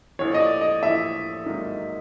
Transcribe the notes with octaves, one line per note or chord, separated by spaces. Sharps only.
A#1 A2 E3 C#5
D#5
D5
D#5
A#1 A2 E3 E5
G#2 D#3 F#3 A#3 D#4